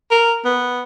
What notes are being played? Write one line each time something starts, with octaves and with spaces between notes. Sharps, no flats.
A#4
B3